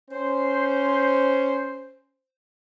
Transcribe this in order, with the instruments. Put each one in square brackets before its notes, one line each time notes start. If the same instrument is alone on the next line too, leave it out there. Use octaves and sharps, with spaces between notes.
[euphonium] C#4 [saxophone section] C5